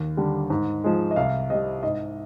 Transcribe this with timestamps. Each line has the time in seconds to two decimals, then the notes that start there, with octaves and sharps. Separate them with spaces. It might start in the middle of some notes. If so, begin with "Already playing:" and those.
Already playing: D#2
0.17 D3 G3
0.50 G#2
0.84 F3 G#3
1.11 D#5
1.16 C2 F5
1.50 C3 G3 D#5
1.83 G#2 D#5